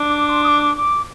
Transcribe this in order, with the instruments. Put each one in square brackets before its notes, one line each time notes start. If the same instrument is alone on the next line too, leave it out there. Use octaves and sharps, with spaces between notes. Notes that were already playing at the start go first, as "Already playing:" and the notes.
Already playing: [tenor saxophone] D4
[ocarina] D6
C6
D#6
D6
D6